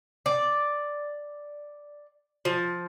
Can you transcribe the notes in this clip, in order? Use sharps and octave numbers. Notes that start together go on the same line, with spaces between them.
D5
F3